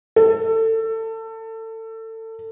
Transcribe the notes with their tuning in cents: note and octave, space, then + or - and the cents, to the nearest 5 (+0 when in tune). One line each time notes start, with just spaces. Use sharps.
A4 +25